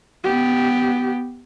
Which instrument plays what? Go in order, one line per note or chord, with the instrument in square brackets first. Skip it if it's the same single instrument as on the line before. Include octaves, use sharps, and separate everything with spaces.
[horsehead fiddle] B3 G4